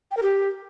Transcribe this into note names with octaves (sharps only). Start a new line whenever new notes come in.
G5
A#4
G4